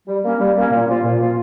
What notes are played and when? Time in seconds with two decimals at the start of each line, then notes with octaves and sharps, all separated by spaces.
0.08 G3
0.24 A#3 C#4
0.40 G3
0.57 A#3 C#4
0.72 A#2
0.88 F3 A#3 F4
1.04 A#2
1.20 F3 A#3 F4